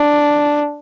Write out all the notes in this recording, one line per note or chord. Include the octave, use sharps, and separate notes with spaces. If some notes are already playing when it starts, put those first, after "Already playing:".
Already playing: D4